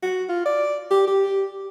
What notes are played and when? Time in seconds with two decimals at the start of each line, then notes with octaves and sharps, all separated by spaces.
0.03 F#4
0.29 F4
0.46 D5
0.91 G4
1.07 G4